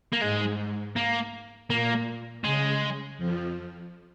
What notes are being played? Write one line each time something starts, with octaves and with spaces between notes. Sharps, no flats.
A#3
G#2 G#3
A#3
A#2 A#3
C#3 G#3
F2 F3